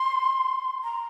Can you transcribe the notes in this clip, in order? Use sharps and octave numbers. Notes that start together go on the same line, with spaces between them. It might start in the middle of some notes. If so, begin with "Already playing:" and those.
Already playing: C6
A#5